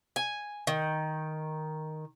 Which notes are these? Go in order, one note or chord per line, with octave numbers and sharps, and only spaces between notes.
G#5
D#3